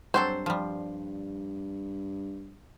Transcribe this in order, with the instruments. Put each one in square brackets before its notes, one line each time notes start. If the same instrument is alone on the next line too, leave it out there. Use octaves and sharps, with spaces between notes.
[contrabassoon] G2 [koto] F#3 C4 A4 [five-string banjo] C5
[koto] F3 G3